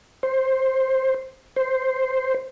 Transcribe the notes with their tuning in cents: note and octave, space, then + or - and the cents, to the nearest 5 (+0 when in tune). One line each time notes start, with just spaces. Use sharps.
C5 +10
C5 -5